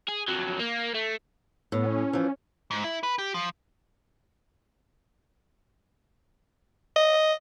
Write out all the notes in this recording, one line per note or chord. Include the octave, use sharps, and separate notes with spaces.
G#4
F2 F#3
A#3
A3
A2 B3
C#4
E3 F3
G#2
E4
B4
G4
F3
D#5